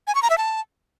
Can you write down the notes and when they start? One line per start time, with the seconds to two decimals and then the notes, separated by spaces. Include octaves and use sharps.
0.07 G#5
0.15 C#6
0.23 A#5
0.30 E5
0.38 A5